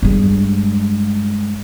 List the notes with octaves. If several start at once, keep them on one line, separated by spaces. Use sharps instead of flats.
G2 G#3